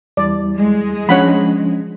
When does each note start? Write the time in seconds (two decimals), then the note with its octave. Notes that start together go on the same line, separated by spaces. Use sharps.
0.17 E2 G3 E4 D5
0.57 G#3
1.09 F3 C#4 D4 C#5 F#5 B5